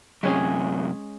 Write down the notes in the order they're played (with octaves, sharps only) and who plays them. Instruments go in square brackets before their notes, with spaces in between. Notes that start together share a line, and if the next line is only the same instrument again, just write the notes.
[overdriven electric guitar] F#2 C3 [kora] G#3 C#4 G#4